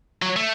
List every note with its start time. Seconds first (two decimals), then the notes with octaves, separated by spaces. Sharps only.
0.22 F#3
0.36 A3